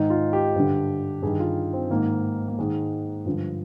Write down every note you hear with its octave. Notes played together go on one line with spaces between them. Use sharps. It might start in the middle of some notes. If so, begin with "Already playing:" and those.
Already playing: G#2 D#3 D#4
F4
G4
G2 D3
G2 D#3 G#4
F4
C4
G#2 D#3 A#3
A#3
G#2 D#3 G#3
G2 D3 F3